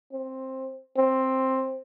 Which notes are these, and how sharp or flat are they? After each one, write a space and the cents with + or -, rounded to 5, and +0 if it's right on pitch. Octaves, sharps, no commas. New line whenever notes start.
C4 +10
C4 +10